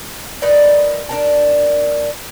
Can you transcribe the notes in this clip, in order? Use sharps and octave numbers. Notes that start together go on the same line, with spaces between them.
D#4 A#4 B4 D5
D4 A#4 A5